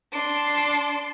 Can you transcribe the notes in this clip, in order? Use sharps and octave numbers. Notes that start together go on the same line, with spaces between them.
D4 C6